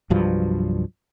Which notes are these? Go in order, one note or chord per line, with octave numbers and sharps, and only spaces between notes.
C2 G2 F3 F#3